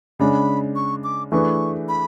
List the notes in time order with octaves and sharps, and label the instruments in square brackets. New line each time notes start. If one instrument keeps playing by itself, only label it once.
[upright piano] C#3 G#3 D4 [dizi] B5
[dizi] C#6
D6
[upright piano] E3 A3 D4 G#4 B4 [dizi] C#6
[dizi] B5